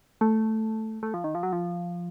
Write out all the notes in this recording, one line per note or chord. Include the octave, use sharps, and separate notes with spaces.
A3
A3
F3
D#3
F3
F#3
F3